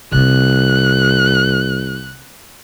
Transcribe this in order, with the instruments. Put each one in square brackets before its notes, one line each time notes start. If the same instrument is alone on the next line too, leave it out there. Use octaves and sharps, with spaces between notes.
[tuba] C2 [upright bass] C3 C4 [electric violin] F#6